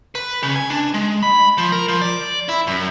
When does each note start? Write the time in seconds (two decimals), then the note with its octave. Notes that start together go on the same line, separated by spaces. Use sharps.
0.15 B4
0.43 C#3
0.56 G#5
0.70 D4
0.94 G#3
1.23 B5
1.58 F3
1.72 A#4
1.88 F3
2.01 D5
2.49 E4
2.67 F#2